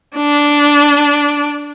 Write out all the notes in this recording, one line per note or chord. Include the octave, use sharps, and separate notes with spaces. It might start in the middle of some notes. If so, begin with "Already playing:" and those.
D4